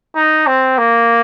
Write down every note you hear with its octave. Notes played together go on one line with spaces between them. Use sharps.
D#4
C4
A#3